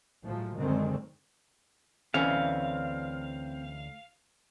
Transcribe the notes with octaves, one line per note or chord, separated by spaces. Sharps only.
A2 F3 F#3 G#3
F#2 D3 D#3 F#3 G#3 C4
D2 E3 C4 C#4 F5